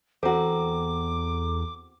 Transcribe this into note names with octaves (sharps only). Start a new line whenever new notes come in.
E2 C4 F#4 A4 A#5 D6